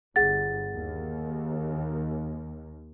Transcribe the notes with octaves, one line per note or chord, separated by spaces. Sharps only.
G1 G2 G#4 F#5 A6
D#2